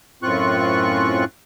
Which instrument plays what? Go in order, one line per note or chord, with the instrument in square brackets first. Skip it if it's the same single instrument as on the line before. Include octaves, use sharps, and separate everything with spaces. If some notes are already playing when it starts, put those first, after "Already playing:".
[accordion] F#2 A2 C4 F4 C#6 F#6